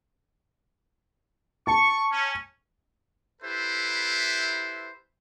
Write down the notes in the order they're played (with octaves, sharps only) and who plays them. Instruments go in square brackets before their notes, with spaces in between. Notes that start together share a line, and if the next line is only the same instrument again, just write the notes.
[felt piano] A5 [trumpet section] C#6
[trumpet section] C#4
E4 G4 A4 B4 C5 E5